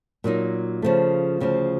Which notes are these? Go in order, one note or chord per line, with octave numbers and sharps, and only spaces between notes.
A#2 F#3 A#3 D#4
C#3 F3 A3
D2 C#3 F3